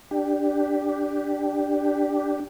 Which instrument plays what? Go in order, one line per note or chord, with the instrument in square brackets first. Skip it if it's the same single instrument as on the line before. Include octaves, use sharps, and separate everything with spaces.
[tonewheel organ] D4 G4